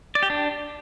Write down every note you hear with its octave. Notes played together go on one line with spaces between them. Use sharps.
D5
G4
D4